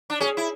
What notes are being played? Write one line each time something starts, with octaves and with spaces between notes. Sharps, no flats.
D4
C#4 G#4
E4